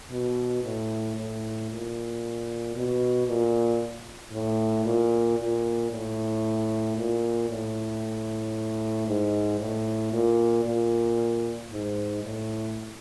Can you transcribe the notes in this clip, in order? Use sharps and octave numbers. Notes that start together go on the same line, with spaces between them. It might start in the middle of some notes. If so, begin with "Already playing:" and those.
B2
A2
A2
A#2
B2
A#2
A2
A#2
A#2
A2
A#2
A2
G#2
A2
A#2
A#2
G#2
A2